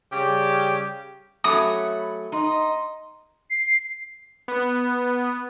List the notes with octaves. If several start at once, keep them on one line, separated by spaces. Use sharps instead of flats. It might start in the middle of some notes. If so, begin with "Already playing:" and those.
C#3 G3 G4
F#3 A3 C#4 B5 D#6
D#4 D#5 A#5 C6
C7
B3